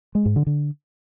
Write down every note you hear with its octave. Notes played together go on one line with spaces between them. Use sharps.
G#3
G#2
D3
D3